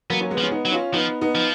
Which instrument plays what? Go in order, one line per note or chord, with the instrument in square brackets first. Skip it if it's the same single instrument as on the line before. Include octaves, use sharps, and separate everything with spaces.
[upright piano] F#3 A#3 [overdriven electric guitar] B3
[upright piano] C#4
G#3 B3
[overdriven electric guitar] F3
[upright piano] C#4
B3 D#4
[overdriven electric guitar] F#3
[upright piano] C#4 F4
[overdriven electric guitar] F3 [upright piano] B3 D#4
[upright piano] B3 D#4
[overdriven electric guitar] F3